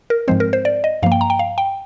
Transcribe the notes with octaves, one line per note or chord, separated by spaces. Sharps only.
A#4
G#2 F3 G#3 C4 C5
A#4
C5
D5
D#5
G2 F3 A#3 F5
G5
A#5
G5
F5
G5